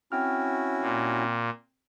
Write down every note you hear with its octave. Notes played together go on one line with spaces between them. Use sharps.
C4 C#4 E4 F#4 G5 F6
A#2